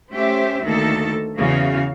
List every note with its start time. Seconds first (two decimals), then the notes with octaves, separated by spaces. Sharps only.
0.11 A3 C#4 G4 C5 E5
0.62 D2 D#3 A#3 A4
1.37 E2 C#3 E3 F#4 F5